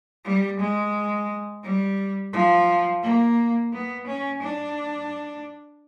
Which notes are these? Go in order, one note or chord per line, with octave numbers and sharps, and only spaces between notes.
G3
G#3
G3
F3
A#3
B3
C#4
D4